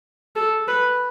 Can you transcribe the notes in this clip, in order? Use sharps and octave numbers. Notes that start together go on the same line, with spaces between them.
A4
B4